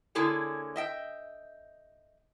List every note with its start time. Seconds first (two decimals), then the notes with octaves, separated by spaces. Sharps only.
0.15 D3 A#3 E4 G#4 A4 C#5
0.76 D#5 E5 G5